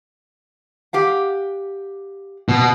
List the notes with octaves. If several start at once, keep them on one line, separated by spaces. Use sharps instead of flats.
G4 F5 F#5
B2